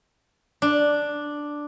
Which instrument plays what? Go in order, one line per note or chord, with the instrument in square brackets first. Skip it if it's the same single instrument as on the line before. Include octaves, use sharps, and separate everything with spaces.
[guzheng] D4